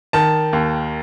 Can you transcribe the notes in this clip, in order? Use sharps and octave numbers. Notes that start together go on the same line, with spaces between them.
D#3 A5
D#2